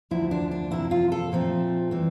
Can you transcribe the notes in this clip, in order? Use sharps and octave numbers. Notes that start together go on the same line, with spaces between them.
D2 D3 F3 A#3 E4
D4
D4
C3 F3 A#3 E4
F4
A4
A#2 F3 A3 C4
E3 G3 C4